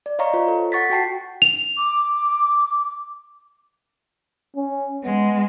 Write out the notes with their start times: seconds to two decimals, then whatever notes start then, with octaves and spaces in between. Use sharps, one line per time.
0.06 D5
0.19 C#5 D#5 F5 A#5 C#6
0.34 F4 C5
0.48 A4
0.72 F#5 C#6 A6 B6
0.90 F#4 G5 A5 C7
1.42 F7
1.77 D6
4.56 C#4
5.04 G#3 B3